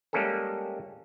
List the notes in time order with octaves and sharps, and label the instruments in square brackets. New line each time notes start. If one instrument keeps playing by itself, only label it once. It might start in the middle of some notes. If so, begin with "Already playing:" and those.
[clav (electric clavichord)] G3 G#3 A#3 C#4 G#4 A4